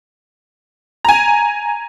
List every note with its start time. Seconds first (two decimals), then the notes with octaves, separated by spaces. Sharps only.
1.05 G#5 A#5